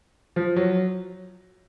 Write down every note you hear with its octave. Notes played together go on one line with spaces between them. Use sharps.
F3
F#3